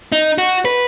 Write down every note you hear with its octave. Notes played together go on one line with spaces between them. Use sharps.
D#4
F#4
B4